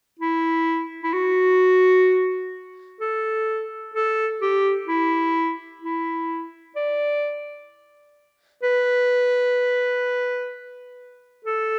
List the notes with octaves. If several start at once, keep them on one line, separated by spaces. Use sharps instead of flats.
E4
E4
F#4
A4
A4
G4
E4
E4
D5
B4
A4